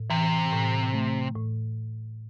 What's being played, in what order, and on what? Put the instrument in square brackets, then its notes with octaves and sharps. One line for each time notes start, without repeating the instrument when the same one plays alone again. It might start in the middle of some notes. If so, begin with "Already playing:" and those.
Already playing: [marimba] A2
[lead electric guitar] C3 [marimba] E3
[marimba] A2
A3
A2